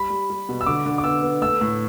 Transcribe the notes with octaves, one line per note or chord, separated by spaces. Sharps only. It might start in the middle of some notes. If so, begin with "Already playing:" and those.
Already playing: G3 B5
G3
G3
B2
E6
D3 D6
D3
D6
B3 E6
B3
A3 E6
A2